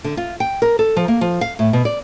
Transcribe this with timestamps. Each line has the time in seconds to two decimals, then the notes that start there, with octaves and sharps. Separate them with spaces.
0.04 D3
0.17 F4
0.40 G5
0.62 A#4
0.79 A4
0.96 F3
1.08 A#3
1.21 F3
1.41 F5
1.59 A2
1.73 B2
1.85 D5